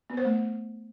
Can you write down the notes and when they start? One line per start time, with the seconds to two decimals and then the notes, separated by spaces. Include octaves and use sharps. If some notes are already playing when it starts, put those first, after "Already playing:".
0.10 B3
0.17 C5
0.25 A3